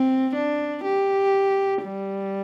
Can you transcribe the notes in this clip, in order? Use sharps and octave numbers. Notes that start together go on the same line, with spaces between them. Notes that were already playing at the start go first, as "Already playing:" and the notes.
Already playing: C4
D4
G4
G3